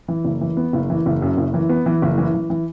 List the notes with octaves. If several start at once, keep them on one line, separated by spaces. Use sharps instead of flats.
E3
F#1
E3
B3
F#1
E3
F#1
F#2
F#1
E3
B3
E3
F#1
E3
E3
E3